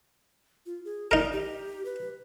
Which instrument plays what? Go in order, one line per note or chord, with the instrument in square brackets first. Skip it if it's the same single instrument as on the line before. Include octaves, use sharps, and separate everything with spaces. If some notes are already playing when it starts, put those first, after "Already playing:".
[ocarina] F4
G#4
[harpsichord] D#4 A#4 [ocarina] D5
[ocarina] G4
B4